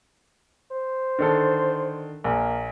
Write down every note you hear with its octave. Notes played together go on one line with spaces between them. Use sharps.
C5
D3 D#3 A4
A#1 A#3